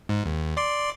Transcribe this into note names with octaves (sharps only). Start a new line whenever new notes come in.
G#2
D#2
D5 C6 D6